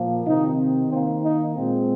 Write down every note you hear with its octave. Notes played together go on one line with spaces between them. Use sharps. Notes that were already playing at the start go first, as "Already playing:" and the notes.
Already playing: A#2 F3 A#3
C3 D#3 C4 D#4
D#3 A#3 C4
D#4
A#2 G#3 C4